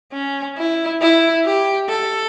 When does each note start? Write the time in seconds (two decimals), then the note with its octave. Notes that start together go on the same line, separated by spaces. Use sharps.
0.13 C#4
0.57 E4
1.01 E4
1.45 G4
1.89 A4